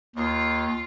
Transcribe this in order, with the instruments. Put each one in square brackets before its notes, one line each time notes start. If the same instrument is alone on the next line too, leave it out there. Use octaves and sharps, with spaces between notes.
[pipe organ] D#2 [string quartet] F4